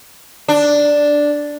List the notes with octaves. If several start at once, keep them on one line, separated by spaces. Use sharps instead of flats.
D4